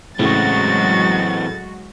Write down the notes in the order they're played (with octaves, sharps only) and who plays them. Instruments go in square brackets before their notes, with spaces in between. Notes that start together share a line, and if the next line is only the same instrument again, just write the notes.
[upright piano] A2 C#3 [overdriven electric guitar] E3 C4 [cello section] F#3 G#3 F#4 [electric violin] A6